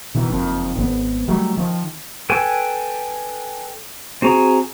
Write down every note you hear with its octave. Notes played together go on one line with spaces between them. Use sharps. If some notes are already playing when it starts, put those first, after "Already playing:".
B2 D#3 E3
F#1 F2 D#3
G#1 B3
D#3 F#3 G3 A3
D#3 F3
A4 B4 G5 G#5
C4 F#4 G#4 A#5